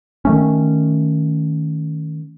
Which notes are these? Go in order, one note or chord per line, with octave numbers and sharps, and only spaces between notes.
D#3 A3 C#4